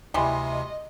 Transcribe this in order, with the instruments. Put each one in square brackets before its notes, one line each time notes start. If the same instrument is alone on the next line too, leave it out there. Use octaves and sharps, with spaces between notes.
[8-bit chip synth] D2 C3 [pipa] E3 G3 [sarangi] D#5 [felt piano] C6